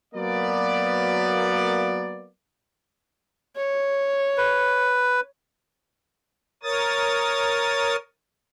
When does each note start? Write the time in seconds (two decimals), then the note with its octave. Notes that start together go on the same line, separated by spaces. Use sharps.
0.14 F#3 A#3 B3 D5
3.57 C#5
4.37 B4
6.63 A#4 C#5 D#6 A6